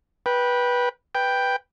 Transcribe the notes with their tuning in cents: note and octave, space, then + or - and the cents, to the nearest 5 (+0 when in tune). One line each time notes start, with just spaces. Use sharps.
B4 -15 G5 +0
B4 +0 G5 +5